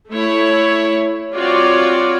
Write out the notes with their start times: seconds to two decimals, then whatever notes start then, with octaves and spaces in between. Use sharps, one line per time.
0.10 A3 E4 C#5
1.33 G3 C4 F4 F#4 C#5 D5